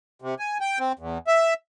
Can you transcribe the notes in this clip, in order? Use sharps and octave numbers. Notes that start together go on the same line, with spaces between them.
C3
G#5
G5
C4
E2
E5